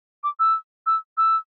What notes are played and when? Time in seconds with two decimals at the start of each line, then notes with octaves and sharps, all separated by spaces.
0.24 D6
0.40 E6
0.86 E6
1.18 E6